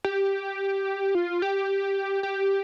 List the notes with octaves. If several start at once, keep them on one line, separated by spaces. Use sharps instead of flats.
G4
F4
G4
G4